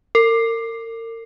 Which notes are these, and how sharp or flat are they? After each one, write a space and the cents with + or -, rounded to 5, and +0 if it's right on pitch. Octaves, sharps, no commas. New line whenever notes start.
A#4 -35